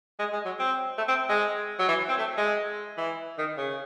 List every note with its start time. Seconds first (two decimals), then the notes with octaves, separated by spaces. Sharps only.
0.19 G#3
0.33 G#3
0.45 F#3
0.59 C4
0.98 A3
1.08 C4
1.29 G#3
1.79 F#3
1.88 E3
2.08 C4
2.18 A3
2.38 G#3
2.97 E3
3.38 D#3
3.57 C#3